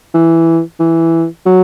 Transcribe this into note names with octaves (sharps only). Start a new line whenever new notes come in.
E3
E3
F#3